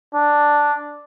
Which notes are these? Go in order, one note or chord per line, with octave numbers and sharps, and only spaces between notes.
D4